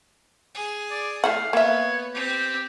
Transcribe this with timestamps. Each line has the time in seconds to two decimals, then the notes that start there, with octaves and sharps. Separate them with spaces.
0.55 G#4
0.91 D5
1.24 A3 E4 F5 F#5
1.53 A#3 B3 C#5 E5
2.14 C4 G4 C5